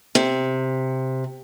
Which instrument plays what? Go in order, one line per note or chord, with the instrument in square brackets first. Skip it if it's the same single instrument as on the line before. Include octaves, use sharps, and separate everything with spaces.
[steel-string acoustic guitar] C3